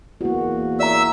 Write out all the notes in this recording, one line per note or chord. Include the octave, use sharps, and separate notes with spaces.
E2 A#3 F#4
D5 E5 A#5 E6